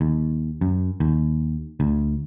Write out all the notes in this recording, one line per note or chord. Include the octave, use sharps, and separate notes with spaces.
D#2
F#2
D#2
D2